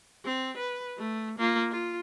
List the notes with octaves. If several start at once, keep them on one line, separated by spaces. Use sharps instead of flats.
C4
B4
A3
A#3 F4
F4